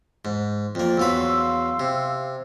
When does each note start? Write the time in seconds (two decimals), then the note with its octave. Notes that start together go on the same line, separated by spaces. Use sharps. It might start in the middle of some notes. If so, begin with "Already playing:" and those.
0.25 G#2
0.75 F2 A#3 D5
0.97 E2 F#3 B4 F5 C6 E6
1.80 C3